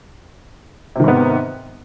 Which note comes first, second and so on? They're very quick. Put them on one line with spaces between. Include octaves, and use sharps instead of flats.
C3 D#3 G#2 B3